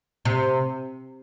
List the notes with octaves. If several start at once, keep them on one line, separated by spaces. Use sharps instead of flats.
C3